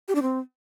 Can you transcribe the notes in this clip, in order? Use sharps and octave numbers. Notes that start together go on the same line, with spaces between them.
G4
D4
C4